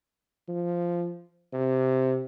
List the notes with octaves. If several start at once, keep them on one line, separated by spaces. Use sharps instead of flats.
F3
C3